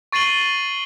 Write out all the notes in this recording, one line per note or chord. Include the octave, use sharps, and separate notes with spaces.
C#6 A6 C7 D#7 F#7 G7